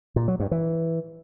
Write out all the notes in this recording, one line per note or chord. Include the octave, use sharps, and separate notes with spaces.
A#2
F#3
G2
E3